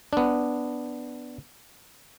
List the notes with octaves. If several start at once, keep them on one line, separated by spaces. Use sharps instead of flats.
B3 D4